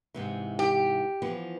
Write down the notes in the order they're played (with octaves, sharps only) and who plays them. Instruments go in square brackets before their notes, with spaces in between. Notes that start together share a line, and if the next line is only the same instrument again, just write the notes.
[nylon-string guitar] G#2 C3 E3
[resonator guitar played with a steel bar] G4
[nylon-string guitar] E3 F3 B3